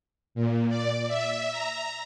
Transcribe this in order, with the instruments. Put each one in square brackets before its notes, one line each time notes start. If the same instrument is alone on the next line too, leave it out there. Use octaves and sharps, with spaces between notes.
[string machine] A#2
D5
E5
A#5